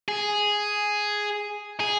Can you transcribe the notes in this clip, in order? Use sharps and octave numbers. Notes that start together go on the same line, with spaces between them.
G#4
G#4